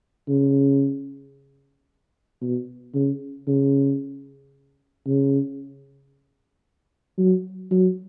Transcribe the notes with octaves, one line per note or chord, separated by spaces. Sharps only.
C#3
B2
C#3
C#3
C#3
F#3
F#3